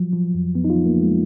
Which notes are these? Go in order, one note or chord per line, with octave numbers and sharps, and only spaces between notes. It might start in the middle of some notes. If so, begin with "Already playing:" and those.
Already playing: F3 F#3
F3
F2
F2 B3
D#4
F4
F3
A#3
F3 G#3